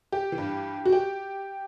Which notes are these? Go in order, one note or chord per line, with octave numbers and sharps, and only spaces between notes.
G4
E3
G2
F#4
G4